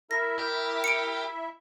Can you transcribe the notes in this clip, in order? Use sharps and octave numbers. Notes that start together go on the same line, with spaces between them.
E4 A#4 E5 A#6
G4 A#4
C#7 D7